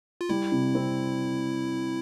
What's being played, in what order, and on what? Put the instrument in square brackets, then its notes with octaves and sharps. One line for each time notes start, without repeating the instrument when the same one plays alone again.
[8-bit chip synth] F4
[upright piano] G3 [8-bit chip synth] E4
[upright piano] C3
C4